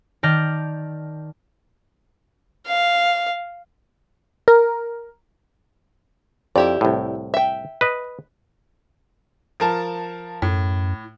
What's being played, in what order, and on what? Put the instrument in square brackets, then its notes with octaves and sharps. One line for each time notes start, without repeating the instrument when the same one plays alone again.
[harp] D#3 D5 A5 F6 G6 A#6
[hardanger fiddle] F5
[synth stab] A#4
[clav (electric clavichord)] F2 [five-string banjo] E4 G4 D5
[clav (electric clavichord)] C2 A2
[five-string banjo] E5 G5
[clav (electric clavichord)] B4 D#5
[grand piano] F3 A#4 A5
[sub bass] F#2 [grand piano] A2